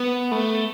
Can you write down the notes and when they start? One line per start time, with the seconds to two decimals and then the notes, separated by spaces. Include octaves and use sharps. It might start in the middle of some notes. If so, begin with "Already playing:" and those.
Already playing: B3
0.32 A3